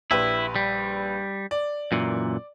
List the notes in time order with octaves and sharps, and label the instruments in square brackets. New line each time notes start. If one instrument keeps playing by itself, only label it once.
[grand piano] A#1 G4 B4 [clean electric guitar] E4
[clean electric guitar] G3
[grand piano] D5
[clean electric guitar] F#2 A#2 E3